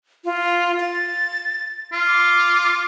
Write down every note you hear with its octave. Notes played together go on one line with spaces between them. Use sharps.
F4
A6
F4
D6